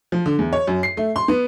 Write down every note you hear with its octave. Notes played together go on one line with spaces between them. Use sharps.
F3
D3
E2
C#5
F#2
C7
A3
C6
B3